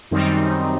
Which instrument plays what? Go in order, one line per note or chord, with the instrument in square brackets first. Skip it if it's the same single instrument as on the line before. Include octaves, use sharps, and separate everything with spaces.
[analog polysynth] F#2 D#3 G3 C4 D#4